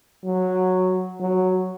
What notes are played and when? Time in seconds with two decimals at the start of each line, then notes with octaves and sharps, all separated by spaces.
0.24 F#3
1.20 F#3